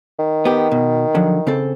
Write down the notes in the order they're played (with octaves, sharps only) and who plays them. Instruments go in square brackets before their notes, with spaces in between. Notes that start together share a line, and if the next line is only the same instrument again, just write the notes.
[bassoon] D#3
[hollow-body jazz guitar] B3 G4
B2
D3 F3 F#3
C#3 C4 A4